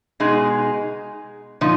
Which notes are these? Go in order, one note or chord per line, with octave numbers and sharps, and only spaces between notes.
B2 G#3 D#4 G#4
A#2 F3 D#4